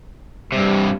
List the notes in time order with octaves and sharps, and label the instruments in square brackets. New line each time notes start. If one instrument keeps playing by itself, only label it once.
[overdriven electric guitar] G2 C3 [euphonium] G3